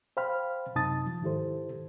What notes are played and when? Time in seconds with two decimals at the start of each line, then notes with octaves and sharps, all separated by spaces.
0.17 C5 F5 G5 B5 F6
0.75 F#2 C3 D#4 A5 D#6 A6
1.06 F3
1.22 G#2 D#3 E4 G4 A4 C5